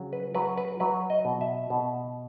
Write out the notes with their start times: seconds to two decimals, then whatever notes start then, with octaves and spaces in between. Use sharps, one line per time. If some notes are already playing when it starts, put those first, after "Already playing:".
Already playing: C#3 F#3
0.13 B4
0.35 F#3 B4
0.57 B4
0.80 F#3 B4
1.10 D#5
1.25 B2
1.41 E5
1.70 B2